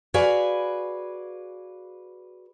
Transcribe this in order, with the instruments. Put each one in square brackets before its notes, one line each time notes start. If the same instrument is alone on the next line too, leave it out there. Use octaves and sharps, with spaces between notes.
[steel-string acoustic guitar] F#4 G#4 B4 D5 F5 G#5